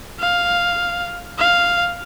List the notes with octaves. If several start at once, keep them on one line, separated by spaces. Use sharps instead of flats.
F5
F5